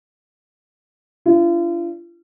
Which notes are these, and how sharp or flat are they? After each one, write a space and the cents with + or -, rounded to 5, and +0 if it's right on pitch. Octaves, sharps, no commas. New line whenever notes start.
D4 -10 F4 -40